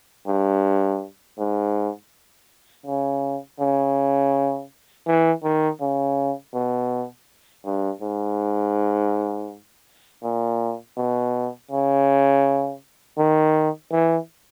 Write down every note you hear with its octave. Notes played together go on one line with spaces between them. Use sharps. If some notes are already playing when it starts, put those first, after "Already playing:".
G2
G#2
C#3
C#3
E3
D#3
C#3
B2
G2
G#2
A#2
B2
C#3
D#3
E3